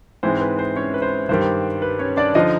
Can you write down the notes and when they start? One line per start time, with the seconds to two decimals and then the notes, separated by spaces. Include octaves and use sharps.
0.23 G#2 E3 G#3 C4 C5
0.41 B4
0.59 C5
0.76 C#4 C#5
0.94 B4
1.02 C5
1.29 G2 D#3 G3 C5
1.82 B4
1.99 C#4 C#5
2.17 D4 D5
2.35 D3 F3 D#4 D#5